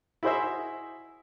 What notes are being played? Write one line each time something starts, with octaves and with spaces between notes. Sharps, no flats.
E4 F#4 G#4 C5 D#5 E5